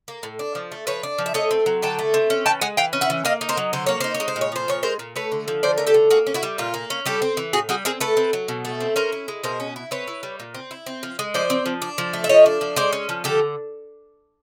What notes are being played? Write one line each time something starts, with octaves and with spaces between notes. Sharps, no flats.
A#3
A2
D4
F3
A3
F3 B4 C#5
D4
F3
E5
A3 C#5 D#5
C4
F#3
D3 G5 A5
A3
C4
C#4
E3 G5 A5
G#3 F#5 G#5
E3 F5 G5
C#4
E5 F#5
E3
A#3 D#5 F5
D#4
A#4 C5
F#3
D3 C5
A#3 C#5
D#4 C5
C#5
G#3
C5
A#2
C#5
F3 C5
A#2 C#5
G#3 A#4 C5
A#2
A3 B4 C#5
D3
F3
D3 C5 D5
A3 A#4
G4 A4
D3
A#3 F#4 G#4
C#4
E4 F#4
G3
A#2 F4
A#3
C#4
G3 G4 A4
C4
E3
A2 F#4 G#4
G3 F#4 G#4
C4 G#4 A#4
A3 A4 B4
C4
F#3
B2
A3
C4
C#4 A#4 C5
E4
G#3
B2 A#4 C5
C#4
E4
C4 B4 C#5
E4
G3
A#2
C4
E4
C4
F3
G#3
F3 C5 D5
C4
F3
D4
F3
A3
E5
F3 C#5 D#5
D4
F3
G#3 C5 D5
C#4
F3
D3 G4 A4